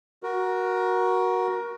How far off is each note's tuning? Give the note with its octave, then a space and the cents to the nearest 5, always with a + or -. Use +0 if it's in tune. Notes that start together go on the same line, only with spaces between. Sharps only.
F#4 +0 A#4 +20